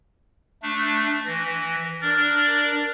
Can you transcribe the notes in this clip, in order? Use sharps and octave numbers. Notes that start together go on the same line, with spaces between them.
A3 D4
E3 A#6
D4 A#4 D5 A6